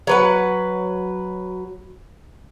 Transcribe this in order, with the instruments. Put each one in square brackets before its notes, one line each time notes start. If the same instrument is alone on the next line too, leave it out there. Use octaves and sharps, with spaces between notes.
[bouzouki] F#3 B4 F#5